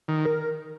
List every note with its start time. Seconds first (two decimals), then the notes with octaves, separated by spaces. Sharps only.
0.08 D#3
0.25 A#4